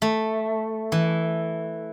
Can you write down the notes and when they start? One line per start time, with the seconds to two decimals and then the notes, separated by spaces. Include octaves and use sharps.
0.02 A3
0.92 E3